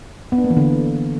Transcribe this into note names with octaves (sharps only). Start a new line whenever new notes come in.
B3
D4
A#3
E3
D3